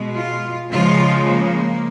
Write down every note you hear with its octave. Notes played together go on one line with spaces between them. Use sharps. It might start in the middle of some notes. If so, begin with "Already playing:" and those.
Already playing: B2 G#3
F4
C#3 F3 G#3 F4
A#3